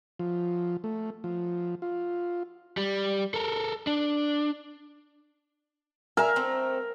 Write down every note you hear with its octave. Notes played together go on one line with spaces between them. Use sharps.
F3
A3
F3
F4
G3
A4 A#4
D4
A#4 E5 F5 G#5
A3 C4